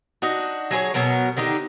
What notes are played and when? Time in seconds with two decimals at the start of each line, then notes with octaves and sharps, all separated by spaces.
0.22 D4 D#4 F#4
0.71 F#3 G#4 B4 C#5
0.94 B2 F#3 B3 A#4
1.37 D3 D#3 D#4 G4